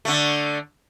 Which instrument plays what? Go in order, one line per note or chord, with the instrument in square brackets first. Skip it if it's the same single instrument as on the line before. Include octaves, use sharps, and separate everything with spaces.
[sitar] D3 A3